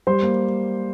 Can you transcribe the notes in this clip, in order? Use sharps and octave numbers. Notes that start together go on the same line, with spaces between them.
G3 C5 C6
A#3